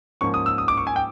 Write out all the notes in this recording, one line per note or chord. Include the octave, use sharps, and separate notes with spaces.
G#2 F3 A#3 C#4 C#6
D#6
E6
D#6
D6
C#6
G#5
G5